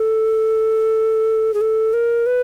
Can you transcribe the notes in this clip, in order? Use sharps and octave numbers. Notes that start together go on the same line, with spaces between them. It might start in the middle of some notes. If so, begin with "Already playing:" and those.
Already playing: A4
G#4
A4
A#4
B4